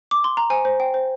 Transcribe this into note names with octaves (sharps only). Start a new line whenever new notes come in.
D6
C6
A#5
C5 G#5
C5
G5
C5